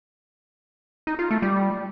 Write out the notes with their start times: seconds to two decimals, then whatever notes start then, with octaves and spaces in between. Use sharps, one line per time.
1.07 D#4
1.19 F4
1.31 A3
1.42 G3